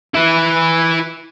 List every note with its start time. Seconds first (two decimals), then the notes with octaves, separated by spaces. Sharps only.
0.15 E4 B4